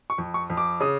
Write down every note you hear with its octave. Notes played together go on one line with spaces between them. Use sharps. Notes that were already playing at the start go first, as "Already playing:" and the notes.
C#6
F2
C#6
F2
D6
C#3 D#6